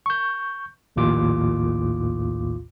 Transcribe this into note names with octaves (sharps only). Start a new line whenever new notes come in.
C#6 G6
A#1 D#2 A2 F4 D6